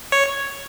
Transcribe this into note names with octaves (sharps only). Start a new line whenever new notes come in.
C#5